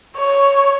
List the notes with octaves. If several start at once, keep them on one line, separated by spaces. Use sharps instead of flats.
C#5